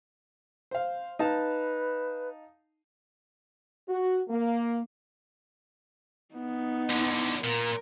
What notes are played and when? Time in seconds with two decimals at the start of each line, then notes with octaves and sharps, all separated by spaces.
0.71 C5 F5
1.19 D#4 B4 F5 A5
3.88 F#4
4.29 A#3
6.35 B3 D#4
6.90 E2 D3
7.44 A#2 A#4